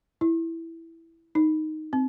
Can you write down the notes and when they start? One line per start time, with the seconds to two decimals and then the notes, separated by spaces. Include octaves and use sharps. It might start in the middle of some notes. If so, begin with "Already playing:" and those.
0.21 E4
1.35 D#4
1.93 C4